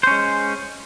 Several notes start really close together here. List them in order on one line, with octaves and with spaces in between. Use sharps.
C5 C#4 G#3